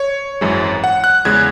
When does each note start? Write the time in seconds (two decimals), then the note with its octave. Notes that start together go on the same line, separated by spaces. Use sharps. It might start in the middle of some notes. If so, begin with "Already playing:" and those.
Already playing: C#5
0.41 G#1 F#2 E3 G#3
0.84 F#5
1.04 F#6
1.25 E2 C#3 G#3 G#6